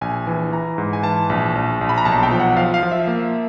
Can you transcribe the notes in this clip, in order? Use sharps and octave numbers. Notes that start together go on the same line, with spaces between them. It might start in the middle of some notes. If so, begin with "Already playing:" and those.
A#1 G#5
E3
E3 A#5
G#2
G#5
E3 A5
A#1
A#1
A#1
B5
A#5
B1 A5
G5
F3
F#5
F3 F5
F5
F3
E5
A#3